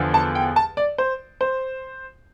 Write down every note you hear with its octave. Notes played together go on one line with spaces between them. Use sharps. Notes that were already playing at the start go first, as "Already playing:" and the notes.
Already playing: E2 D3 F3
A5
G5
A5
D5
C5
C5